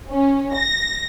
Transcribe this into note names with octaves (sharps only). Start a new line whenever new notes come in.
C#4
A#6